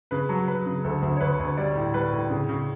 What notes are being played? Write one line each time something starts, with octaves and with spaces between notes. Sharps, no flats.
C#3 B4
F#3
F#3 B4
C#3
D2 A4
D2
C#5
D2 B4
D2
G3 D5
A2
G3 B4
A2
C#3
C#3